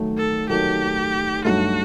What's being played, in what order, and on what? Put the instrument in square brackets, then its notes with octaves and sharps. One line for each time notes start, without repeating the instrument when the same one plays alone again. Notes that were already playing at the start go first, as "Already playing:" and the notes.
Already playing: [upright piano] D#3 F#3 A3
[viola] A4
[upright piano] D#3 F#3 A3 [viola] G4
[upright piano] G2 F#3 A3 D#4 [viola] F#4